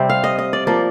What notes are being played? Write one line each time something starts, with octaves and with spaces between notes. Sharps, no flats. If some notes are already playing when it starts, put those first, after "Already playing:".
Already playing: C3 G3 C4 C5
F5
D#5
D#5
D5
F3 A#3 D5